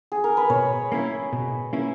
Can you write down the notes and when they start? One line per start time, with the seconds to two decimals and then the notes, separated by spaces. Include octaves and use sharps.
0.12 G#4
0.24 A#4
0.37 B4
0.50 B2 C#5
0.92 A#3 C#4 E4
1.33 B2
1.73 A#3 C#4 E4